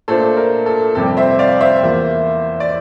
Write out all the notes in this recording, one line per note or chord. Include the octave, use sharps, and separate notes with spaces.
A#2 A3 D4 F4 A4 C5
A#4
A4
F2 C3 G3 C4 A4
C5 E5
D5 F5
C5 E5
E2 E3 A#3 F4
D5